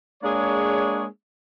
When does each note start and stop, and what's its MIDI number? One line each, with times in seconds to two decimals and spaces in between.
0.23 1.06 56
0.23 1.06 58
0.23 1.06 62
0.23 1.06 68
0.23 1.06 73